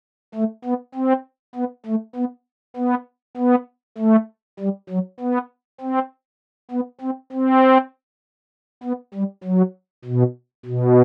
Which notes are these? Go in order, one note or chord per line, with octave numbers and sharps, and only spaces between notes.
A3
B3
C4
B3
A3
B3
B3
B3
A3
G3
F#3
B3
C4
B3
C4
C4
B3
G3
F#3
B2
B2